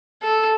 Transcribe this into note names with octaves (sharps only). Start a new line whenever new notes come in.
A4